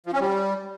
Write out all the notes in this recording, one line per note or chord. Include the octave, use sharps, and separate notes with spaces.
F3
C#4
G3